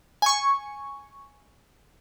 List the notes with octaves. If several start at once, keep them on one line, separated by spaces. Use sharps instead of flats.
G#5 C#6